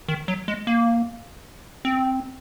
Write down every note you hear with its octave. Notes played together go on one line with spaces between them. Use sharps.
D#3
F#3
G#3
A#3
C4